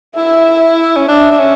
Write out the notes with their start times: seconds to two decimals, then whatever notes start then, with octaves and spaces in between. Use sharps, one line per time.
0.17 E4 E5
0.96 C#4
1.09 D4 E5
1.31 D4
1.39 C#4